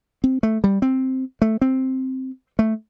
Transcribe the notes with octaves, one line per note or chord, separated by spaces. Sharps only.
C4
A3
G3
C4
A3
C4
A3